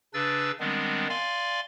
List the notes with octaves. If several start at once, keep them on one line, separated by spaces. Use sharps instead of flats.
C#3 D4 B4 E6 A6
D#3 G3 G#3 B3 C4 D4
D5 F5 G#5 C6